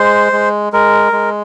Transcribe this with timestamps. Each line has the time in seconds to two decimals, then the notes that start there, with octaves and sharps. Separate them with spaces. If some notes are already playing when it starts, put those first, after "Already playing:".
Already playing: G#3 C5
0.32 G#3
0.73 G#3 A#4
1.13 G#3